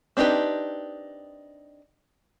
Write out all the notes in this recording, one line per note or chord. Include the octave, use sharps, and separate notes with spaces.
C4 D4 D#4 G4 B4